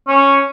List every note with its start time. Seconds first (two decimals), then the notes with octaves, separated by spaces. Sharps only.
0.08 C#4